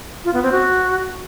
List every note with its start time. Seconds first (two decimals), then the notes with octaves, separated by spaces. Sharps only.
0.25 F4
0.34 B3
0.43 C4
0.52 F#4